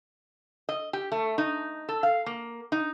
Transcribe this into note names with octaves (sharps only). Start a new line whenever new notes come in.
D#5
G4
A3
D#4
A4
F5
A#3
D#4